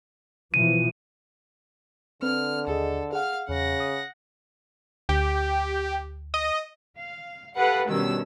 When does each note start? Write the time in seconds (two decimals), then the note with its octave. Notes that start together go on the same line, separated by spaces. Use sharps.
0.54 B2 E3 F3 D#7
2.22 D3 C4 B4 F6
2.67 D#2 G#4 A4 D#5
3.13 G#4 F5 F#5 F6
3.49 E2 C#3 F#5 A#6
3.80 D#6
5.09 D2 G4
6.34 D#5
6.97 F5
7.56 G4 A4 B4 F5 F#5
7.89 G2 B2 D#3 C#4 E6